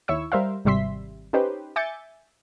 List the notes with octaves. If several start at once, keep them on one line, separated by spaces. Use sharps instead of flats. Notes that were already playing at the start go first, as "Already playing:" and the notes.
D#2 E4 C#5 C#6 E6
G3 A#4 C5 E5 F5
G#1 C3 G3 E5 C6 B6
C#4 D#4 G4 B4 C5
E5 G#5 D6 G6 A6 C#7